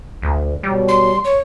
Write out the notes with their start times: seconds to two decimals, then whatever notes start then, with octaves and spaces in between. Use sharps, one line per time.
0.22 D2
0.63 B2 F#3 G3
0.88 C6
1.25 C#5